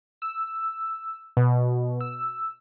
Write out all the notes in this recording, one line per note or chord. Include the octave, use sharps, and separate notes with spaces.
E6
B2
E6